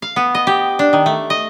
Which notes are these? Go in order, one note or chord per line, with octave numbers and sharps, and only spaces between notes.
F5
B3
D#5
G4
D4
D#3
A3
D#5